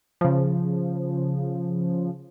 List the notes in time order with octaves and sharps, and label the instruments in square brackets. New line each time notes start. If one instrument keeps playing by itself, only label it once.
[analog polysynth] C#3 F3